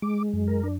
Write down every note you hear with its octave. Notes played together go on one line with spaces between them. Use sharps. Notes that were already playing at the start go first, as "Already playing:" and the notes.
G#3 D6
F#2
A#4
D4